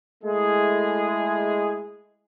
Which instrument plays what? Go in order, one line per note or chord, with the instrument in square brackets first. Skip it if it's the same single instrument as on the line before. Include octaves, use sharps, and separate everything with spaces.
[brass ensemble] G#3 A3 E4 G#4